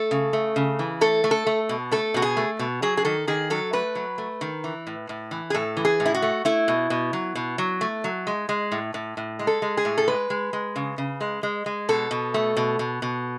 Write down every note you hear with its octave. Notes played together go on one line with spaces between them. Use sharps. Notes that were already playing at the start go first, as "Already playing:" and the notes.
Already playing: A3 A4
C#3
A3
C#3
E3
A3 A4
A3
A4
A3
B2
A3 A4
B2 F#4
G#4
A3
B2
F#3 G#4
G#4
D#3 A4
D#3 G#4
F#3 A4
A3 B4
F#3
A3
D#3
E3
A2
A2
E3
G#4
A2 A4
E3
G#4
A2
E4
F#4
A3
A3 E4
B2
B2
F#3
B2
F#3
A3
F#3
G#3
G#3
A2
A2
A2
G#3
A4
G#3
G#4
A2
A4
G#3 B4
G#3
G#3
C#3
C#3
G#3
G#3
G#3
B2 A4
B2
A3
B2
B2
B2